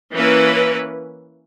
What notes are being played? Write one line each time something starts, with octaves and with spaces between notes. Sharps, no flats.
E3 A#3 C#4 E4 B4